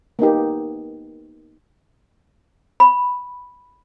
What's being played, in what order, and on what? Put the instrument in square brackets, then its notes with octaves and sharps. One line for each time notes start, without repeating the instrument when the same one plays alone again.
[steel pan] A#3 B3 D#4 G4
[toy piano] B5